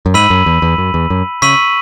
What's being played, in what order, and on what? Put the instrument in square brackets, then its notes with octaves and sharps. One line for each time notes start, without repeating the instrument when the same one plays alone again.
[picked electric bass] F#2
[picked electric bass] G#2 [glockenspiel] B5 E6 B6 D#7 F#7
[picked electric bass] F#2
E2
E2
F#2
E2
F#2
[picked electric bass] C#3 [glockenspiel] C#6 E6 B6 D#7 F#7